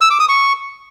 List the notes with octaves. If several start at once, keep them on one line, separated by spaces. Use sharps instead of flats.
E6
D6
D#6
C#6